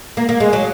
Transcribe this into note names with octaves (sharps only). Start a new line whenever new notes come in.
A#3
A#3
G#3
F#3